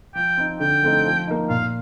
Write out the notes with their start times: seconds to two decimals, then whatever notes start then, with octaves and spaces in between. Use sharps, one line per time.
0.15 F3 G5
0.37 C4 D#4
0.60 D3 G5
0.83 F3 A3 C4 D#4
1.05 F3
1.27 A#3 D#4
1.49 A#2 F5